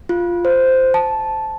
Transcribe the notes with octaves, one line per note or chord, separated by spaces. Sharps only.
F4
C5
A5